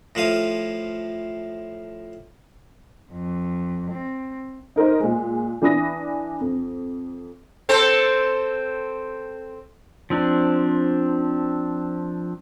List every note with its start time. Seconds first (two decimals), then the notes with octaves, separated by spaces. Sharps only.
0.15 A2 F3 F5 D#6
3.11 F2
3.91 C4
4.76 D#4 A#4 C5 D#5
5.00 A#2 G#3
5.62 E3 D4 B5 D#6 A#6
6.40 F2
7.69 C4 A4 C5
10.10 F3 C4 D4